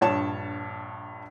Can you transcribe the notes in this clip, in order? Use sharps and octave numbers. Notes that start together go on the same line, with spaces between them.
A#1 G2 C#5 A5 E7